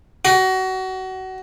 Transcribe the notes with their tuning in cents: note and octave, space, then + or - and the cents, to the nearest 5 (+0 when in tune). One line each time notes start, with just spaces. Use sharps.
F#4 +25